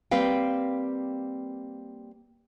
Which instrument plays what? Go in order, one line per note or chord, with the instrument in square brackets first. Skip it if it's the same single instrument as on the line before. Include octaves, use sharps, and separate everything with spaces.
[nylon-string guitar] G3 A#3 C4 B4 F5 G5